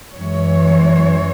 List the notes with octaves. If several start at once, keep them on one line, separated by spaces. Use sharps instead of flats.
F#2 E3 G#3 C#5